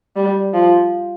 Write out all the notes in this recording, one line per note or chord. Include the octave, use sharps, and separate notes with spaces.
G3
F3